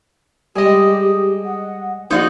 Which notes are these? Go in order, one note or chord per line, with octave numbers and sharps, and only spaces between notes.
G3 G#3 G4 G#4 D#5
F#5
A#1 D#4 F4 F#4 C5 D5 C6